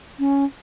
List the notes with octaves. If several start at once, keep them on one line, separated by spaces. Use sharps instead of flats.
C#4